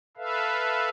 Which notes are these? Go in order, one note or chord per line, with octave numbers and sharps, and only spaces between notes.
A4 B4 E5 F5